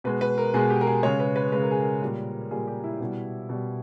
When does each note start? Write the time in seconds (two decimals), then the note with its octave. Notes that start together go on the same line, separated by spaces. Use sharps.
0.04 B2 G#3 B4
0.21 B4
0.38 A#4
0.54 B2 G#3 G#4
0.70 G4
0.81 A#4
0.87 G#4
1.03 C#3 G#3 C#5
1.20 B4
1.36 B4
1.52 C#3 G#3 B4
1.62 A#4
1.71 G#4
1.81 A#4
2.02 A#2 G3
2.51 A#2 G3 G#4
2.67 G4
2.84 E4
3.00 B2 G3
3.49 B2 G3